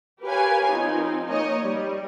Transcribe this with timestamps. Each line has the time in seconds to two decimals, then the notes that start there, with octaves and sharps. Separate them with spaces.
0.22 G4 A#4 B4 C#5 F5 G#5
0.73 F3 C4 D#4
1.27 A#3 D#4 C#5 D#5
1.60 G3